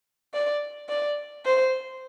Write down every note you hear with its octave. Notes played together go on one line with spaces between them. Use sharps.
D5
D5
C5